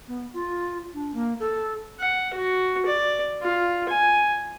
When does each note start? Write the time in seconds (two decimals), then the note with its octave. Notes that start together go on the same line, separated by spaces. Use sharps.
0.08 B3
0.34 F4
0.94 D4
1.14 A#3
1.40 A4
2.00 F#5
2.34 F#4
2.86 D5
3.42 F4
3.89 G#5